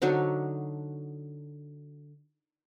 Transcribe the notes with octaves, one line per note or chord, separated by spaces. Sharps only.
D3 F#3 D4 D#4